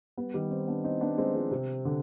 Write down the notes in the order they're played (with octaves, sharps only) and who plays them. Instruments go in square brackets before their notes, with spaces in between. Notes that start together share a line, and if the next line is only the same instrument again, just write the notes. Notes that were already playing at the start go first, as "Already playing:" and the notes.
[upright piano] G3 B3
D#3 G3
C4 D#4
B3 D4
C4 D#4
B3 D4
G#3 C4
F3 G#3
C3
D3